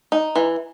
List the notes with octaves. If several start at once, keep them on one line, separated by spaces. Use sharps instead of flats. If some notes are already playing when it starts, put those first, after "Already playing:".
D#4
E3